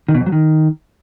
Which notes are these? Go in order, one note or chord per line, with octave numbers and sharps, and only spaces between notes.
D#3
B2
F2
F#3
D#3